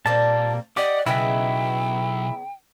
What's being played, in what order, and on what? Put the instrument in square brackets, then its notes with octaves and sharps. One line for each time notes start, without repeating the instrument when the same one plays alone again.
[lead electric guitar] A#2 [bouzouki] G3 A#3 C4 [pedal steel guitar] A5
[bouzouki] G4 D#5 [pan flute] D5 [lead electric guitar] F#5 [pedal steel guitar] D6
[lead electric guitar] B1 [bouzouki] C#3 B3 D#4 [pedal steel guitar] E4 E5 [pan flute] G5